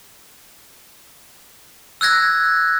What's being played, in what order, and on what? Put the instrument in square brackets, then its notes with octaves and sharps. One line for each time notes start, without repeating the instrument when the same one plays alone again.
[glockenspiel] E6 F#6 G#6 A#6